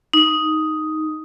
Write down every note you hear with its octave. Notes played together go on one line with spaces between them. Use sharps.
D#4